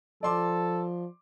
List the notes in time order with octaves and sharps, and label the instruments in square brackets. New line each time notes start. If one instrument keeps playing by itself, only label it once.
[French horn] F3 [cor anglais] A4 [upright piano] D5 C6 D6